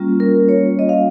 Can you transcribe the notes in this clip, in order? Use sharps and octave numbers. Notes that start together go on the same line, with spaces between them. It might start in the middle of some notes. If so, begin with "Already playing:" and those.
Already playing: G3 A#3 C#4 F4
A#4
C#5
D#5
F5